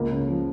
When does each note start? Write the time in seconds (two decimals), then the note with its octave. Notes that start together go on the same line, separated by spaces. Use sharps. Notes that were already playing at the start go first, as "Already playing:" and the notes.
Already playing: C#2 A#3
0.12 C#3
0.29 F3